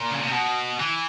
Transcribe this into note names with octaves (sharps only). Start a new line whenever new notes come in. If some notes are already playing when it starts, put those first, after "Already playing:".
Already playing: A#2
C#3
C3
B2
E3